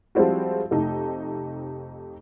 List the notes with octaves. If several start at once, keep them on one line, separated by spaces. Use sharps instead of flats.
F3 G3 G#3 C4 E4 F#4
F2 C3 A3 D#4